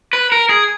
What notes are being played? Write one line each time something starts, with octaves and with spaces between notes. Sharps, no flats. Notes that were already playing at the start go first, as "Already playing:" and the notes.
B4
A#4
G#4